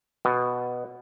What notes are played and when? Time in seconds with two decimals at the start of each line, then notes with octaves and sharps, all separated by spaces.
0.25 B2